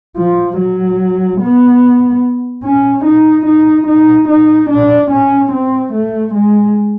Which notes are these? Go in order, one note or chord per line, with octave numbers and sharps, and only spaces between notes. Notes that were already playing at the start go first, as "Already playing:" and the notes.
F3
F#3
B3
C#4
D#4
D#4
D#4
D#4
D4
C#4
C4
A3
G#3